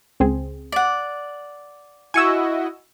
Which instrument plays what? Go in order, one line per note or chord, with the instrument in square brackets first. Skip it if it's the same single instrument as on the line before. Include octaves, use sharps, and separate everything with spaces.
[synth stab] C#2 C4 G#4
[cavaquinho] D5 F#5
[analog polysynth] E4 F#4 D#5 [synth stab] G#5 C#6 E6